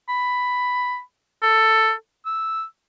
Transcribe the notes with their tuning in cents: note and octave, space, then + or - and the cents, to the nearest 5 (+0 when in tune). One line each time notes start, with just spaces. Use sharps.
B5 +5
A4 +10
E6 -5